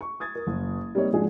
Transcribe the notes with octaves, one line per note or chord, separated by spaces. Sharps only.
C#6
D#6 G#6 A6
A#4
F#1
G3 A#3 C4 D#4 C#5
G#2 F3 G#3 D4 F#4 G#4